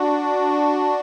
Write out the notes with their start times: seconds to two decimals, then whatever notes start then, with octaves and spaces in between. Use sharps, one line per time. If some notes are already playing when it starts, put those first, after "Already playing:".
Already playing: D4 F#4